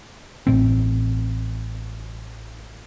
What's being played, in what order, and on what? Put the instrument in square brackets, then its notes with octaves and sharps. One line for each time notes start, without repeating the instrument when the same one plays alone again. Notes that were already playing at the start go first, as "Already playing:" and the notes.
[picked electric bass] A1 A2 C4